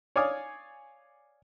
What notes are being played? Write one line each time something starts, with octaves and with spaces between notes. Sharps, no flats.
C#5 D5 F5 G#5 D6 D#6